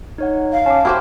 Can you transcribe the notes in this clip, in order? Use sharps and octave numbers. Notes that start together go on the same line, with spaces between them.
D#4 C#5 F#5
F5
C#4 A5 D6
E4 F#4 G4 C5 G#5 F6